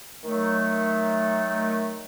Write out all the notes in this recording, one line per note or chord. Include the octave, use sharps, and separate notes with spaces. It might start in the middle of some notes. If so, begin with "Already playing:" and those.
D#3 F#3 A3